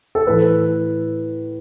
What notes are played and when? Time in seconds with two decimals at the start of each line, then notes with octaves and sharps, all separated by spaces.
0.15 A4
0.27 A2 E3 B4